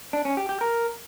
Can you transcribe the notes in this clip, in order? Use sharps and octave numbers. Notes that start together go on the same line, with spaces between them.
D4
C#4
G4
G4
A#4